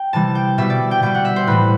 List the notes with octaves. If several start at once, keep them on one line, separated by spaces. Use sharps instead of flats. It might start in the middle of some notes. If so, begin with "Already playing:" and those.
Already playing: G5
C3 E3 G3 A5
G5
B2 G3 E5
D5
G5
B2 G3 G5
F#5
E5
C5
A2 E3 G3 B4